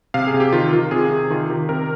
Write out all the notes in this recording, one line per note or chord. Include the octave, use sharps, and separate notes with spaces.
C3 F5
G#4
C3
G4
D#3 F4
D#3 F4
C3 G#4
C3
D#3 F4
D#3 G4
C3 A#4